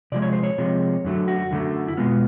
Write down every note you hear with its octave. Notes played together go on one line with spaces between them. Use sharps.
C3 F3 G#3 D5
C#5
C5
C#5
C3 F3 G#3
F#2 D3 F#3 A3
F#4
F#2 D3 F#3 A3
E4
B2 G#3 B3 F4